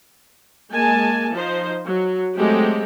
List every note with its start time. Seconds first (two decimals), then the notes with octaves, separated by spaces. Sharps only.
0.71 G#3 A#3 G#5 A5
1.33 F3 D#4 C5
1.85 F#3
2.37 F#3 G#3 A3 C4 G4